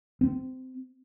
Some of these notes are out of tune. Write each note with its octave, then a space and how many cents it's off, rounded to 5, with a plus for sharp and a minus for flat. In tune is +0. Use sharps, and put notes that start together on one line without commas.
C4 -20